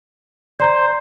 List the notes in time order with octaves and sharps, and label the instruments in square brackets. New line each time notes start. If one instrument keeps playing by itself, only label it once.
[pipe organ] C5 [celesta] D5 A#5 C6